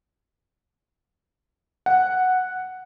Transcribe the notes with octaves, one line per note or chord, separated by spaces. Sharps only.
F#5